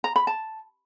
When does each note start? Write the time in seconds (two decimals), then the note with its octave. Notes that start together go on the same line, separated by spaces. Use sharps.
0.04 A#5
0.16 B5
0.27 A5